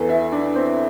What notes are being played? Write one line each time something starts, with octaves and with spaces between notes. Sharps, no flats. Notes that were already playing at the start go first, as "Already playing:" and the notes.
Already playing: E2 E3 A4
E4
D4
C4